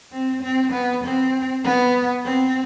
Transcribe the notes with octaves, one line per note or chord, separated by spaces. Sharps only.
C4
C4
B3
C4
B3
C4